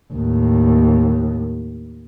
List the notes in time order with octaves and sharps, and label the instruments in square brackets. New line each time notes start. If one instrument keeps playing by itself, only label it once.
[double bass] D#2 A2